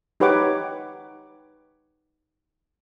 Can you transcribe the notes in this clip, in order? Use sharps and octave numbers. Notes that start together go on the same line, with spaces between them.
D#4 G4 B4 C#5 F#5 D6